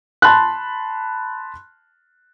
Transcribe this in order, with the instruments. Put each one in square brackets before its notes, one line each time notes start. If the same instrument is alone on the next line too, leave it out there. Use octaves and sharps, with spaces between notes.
[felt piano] A5 B5 C6 F#6